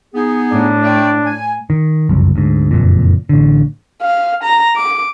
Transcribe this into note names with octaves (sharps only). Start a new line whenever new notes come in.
B3 D#4 G#4
A2 D4
A3 D5 G5
G#5
D#3
F#1 C2 F2
D2 G#2
F#1 F2 A#2
A1 D3
F5
A#5
D6